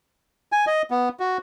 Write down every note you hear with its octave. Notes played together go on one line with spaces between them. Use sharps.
G#5
D#5
B3
F#4